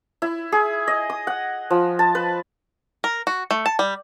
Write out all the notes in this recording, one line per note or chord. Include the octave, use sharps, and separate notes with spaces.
E4
G#4
D#5
D#6
F#5
F3
A5
B4
A#4
F#4
A3
A5
G3